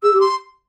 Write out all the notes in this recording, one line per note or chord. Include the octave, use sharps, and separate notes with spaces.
G#4 E6
G4
C6